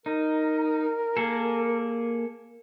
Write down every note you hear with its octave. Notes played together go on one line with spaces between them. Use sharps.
D#4 A#4
A#3 G#4 A4